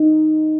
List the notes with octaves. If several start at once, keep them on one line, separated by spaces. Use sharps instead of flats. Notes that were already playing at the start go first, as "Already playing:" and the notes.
Already playing: D#4